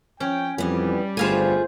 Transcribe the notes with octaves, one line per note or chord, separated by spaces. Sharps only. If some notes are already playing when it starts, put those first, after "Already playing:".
F3 C#4 C#5 G5
F2 E3 G3 B3
G1 A3 F4 G#4 C5 F5 G#5